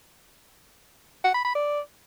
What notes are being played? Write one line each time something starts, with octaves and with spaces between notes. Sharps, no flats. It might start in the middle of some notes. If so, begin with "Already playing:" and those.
F#5
B5
B5
D5